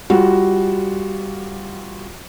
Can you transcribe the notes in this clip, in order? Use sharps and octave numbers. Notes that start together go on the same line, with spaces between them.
G3 F4 F#4